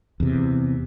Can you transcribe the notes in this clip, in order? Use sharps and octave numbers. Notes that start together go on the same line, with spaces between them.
E2 C3